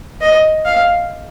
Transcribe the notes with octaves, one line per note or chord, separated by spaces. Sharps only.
D#5
F5